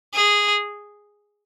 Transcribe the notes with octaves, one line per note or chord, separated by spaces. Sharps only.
G#4